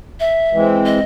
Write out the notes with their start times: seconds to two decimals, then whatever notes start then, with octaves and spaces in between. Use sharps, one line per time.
0.20 E5
0.53 E3 G#3 C4
0.86 D#5